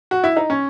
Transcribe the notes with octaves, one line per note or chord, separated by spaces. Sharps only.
F#4
E4
D#4
C#4